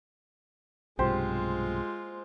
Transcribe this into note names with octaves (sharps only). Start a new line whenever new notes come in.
B1 G2 C3 G#3 F4 G4 C5